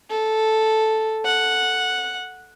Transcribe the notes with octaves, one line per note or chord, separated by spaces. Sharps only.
A4
F#5